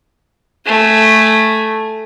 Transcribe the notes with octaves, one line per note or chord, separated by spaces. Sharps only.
A3 G#5